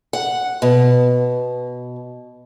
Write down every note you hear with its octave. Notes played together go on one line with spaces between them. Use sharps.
F#5
B2